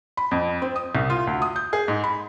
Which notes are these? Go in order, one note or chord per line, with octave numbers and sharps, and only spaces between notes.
B5
F2
C4
D#6
C2
F4
D2
D#6
G6
G#4
G#2
B5